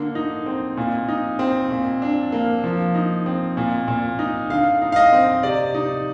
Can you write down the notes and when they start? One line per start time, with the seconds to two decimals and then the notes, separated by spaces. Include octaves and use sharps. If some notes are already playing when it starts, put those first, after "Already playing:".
Already playing: D3 A#3
0.15 D#4
0.46 C4
0.77 A#2
1.08 D#4
1.39 C4
1.70 A#2
2.02 D4
2.32 A#3
2.64 F3
2.95 D#4
3.26 C4
3.57 A#2
3.88 A#2
4.19 D#4
4.50 D3 F5
4.82 D#4
4.92 F5
4.96 D#5
5.13 C4
5.43 C3 D5
5.74 D#4